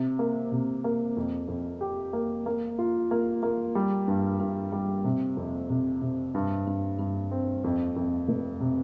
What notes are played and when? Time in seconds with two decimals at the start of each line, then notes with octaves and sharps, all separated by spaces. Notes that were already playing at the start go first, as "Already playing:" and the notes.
Already playing: C3
0.19 A#3
0.52 C3
0.84 A#3
1.17 F2
1.48 F2
1.81 G4
2.13 A#3
2.46 A#3
2.78 F4
3.11 A#3
3.43 A#3
3.75 G3
4.08 G2
4.40 G2
4.72 G3
5.05 C3
5.37 F2
5.70 C3
6.02 C3
6.35 G2
6.67 G2
6.99 G2
7.31 C4
7.64 F2
7.96 F2
8.28 F1
8.60 C3